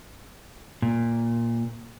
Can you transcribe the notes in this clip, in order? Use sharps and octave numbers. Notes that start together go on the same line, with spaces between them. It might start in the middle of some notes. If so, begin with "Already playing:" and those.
A#2